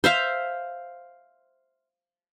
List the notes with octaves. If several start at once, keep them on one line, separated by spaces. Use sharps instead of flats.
C5 E5 F5